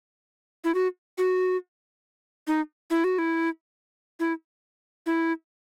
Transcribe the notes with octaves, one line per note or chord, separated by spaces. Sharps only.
E4
F#4
F#4
D#4
E4
F#4
E4
E4
E4